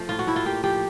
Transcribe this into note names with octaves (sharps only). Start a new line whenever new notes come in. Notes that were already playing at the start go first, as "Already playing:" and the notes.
Already playing: F3 A3
A2 F4
F#4
A2 E4
F4
A#3 G4
F3 G4